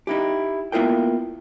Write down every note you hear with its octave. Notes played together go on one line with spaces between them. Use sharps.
D#4 E4 G4
A#3 B3 E4 F4 A#4 G5